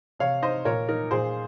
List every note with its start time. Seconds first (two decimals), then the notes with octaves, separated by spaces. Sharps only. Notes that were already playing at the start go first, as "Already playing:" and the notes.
0.19 C3 C#5 F5
0.42 D#4 C5 D#5
0.65 A#2 A#4 C#5
0.89 D#4 A#4
1.11 A#2 G#4 C5